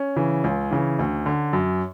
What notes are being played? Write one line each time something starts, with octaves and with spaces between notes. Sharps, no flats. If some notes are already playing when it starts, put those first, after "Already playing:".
Already playing: C#4
C#3 E3
C#2
C#3 E3
D2
D3
F#2